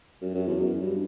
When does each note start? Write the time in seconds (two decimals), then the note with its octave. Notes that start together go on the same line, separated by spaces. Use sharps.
0.21 F#2
0.34 F#2
0.48 E2
0.61 F#2
0.81 G2